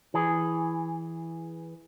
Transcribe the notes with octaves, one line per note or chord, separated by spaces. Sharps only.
E3 G#4